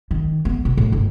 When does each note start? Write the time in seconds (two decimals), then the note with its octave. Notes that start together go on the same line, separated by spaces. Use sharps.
0.11 D#3
0.45 B3
0.65 B2
0.77 A2
0.92 G1